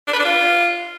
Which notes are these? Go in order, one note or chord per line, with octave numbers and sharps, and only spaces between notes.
D4
B4
D4
F4